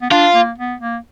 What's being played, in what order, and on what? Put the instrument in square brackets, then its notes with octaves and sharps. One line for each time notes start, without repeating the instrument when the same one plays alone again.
[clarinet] B3
[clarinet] D4 [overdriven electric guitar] F4
[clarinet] A#3
B3
A#3